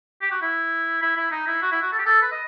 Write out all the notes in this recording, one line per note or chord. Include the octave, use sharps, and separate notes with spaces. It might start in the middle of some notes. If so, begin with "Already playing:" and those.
G4
F#4
E4
E4
E4
D#4
E4
F#4
E4
F#4
A4
G4
A4
B4
D#5